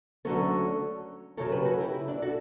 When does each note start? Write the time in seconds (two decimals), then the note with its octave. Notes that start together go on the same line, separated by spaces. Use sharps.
0.25 D2 D3 F#3 A3 C#4 A4 C#5
1.37 F#2 C#3 F#3 A4 C#5
1.52 G4 B4
1.65 F#4 A4
1.80 E4 G4
1.94 E4
2.08 D4
2.22 F#4 A4